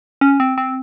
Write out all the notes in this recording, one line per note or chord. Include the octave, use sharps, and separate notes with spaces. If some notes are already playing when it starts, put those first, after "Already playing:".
C#4
C4
C4